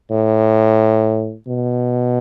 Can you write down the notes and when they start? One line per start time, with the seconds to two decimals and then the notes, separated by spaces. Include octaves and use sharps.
0.10 A2
1.47 B2